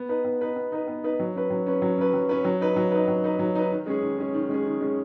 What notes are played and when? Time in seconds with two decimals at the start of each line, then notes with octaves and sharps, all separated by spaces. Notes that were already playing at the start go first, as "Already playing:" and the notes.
Already playing: B3
0.09 D#4 B4
0.25 B3
0.41 D#4 B4
0.56 B3
0.72 D#4 B4
0.87 B3
1.04 D#4 B4
1.19 F#3
1.35 C#4 B4
1.50 F#3
1.67 C#4 B4
1.82 F#3
1.98 C#4 B4
2.14 F#3
2.29 C#4 B4
2.44 F#3
2.61 D#4 B4
2.76 F#3
2.92 D#4 B4
3.08 F#3
3.24 D#4 B4
3.39 F#3
3.55 D#4 B4
3.71 D#3
3.86 G#3 C#4 G#4
4.02 D#3
4.18 G#3 C#4 G#4
4.34 D#3
4.49 G#3 C#4 G#4
4.65 D#3
4.81 G#3 C#4 G#4